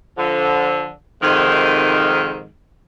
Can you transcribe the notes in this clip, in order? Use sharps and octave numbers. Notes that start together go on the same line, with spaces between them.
D3 F3
F2 G#2 C3 D#3